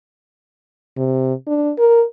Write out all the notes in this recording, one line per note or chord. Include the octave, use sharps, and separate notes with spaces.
C3
D4
A#4